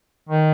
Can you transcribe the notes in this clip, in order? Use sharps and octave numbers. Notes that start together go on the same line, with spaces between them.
D#3